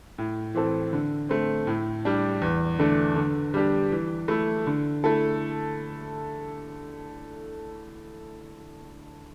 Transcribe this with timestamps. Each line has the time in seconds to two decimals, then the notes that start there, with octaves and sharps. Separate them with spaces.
0.18 A2
0.55 E3 C4 A4
0.93 D3
1.29 A3 C4
1.67 A2
2.05 G3 D4
2.42 E2
2.79 D3 A3 D4
3.16 D3
3.54 G3 D4 G4
3.92 E3
4.28 A3 E4
4.67 D3
5.04 A3 E4 A4